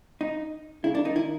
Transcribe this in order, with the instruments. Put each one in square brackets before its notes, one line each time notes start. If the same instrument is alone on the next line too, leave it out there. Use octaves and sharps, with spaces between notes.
[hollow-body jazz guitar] D#4
[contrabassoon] C#3 [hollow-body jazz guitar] E4
[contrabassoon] D#3 [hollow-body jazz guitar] D4
[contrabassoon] D#3 [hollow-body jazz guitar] D#4
[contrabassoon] D#3 [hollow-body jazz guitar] E4